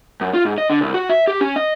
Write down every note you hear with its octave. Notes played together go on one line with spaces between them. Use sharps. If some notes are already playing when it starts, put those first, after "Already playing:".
F#2
F4
G#2
D#5
D3
C2
F#4
E5
G4
C#4
D#5